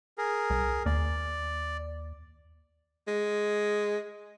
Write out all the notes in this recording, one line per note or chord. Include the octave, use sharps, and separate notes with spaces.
G#4 A#4
C2
D#2 D5
G#3